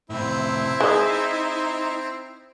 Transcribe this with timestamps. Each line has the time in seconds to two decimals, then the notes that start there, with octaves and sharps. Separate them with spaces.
0.10 A2 C3 C4 E4
0.80 G#3 D#4 D#5